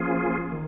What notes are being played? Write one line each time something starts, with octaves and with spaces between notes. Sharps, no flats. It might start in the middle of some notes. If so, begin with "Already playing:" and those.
Already playing: F3 A#3 C#4 F4 G#4
D#3